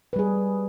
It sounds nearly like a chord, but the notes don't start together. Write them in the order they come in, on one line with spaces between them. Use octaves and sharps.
B4 G3 G#4